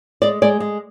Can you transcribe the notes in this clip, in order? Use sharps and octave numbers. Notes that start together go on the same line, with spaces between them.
G#3 D5
G#3 D5
G#3